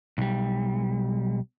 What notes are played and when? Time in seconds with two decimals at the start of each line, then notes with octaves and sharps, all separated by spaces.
0.18 B1 G3